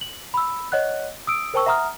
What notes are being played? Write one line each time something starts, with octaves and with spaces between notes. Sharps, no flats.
F#7
B5 E6
C#5 D#5 F#5 F#6
D#6 E6 D7
A#4 C5 G5 A5 C#6 E6
E5 F#5 A#5 D#6 F6